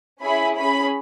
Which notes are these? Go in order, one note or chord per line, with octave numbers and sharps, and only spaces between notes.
C#4 E4 G#4 B5
C#4 G#4 B5